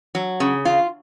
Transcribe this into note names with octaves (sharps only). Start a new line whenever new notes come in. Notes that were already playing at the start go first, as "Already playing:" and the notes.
F#3
C#3
F4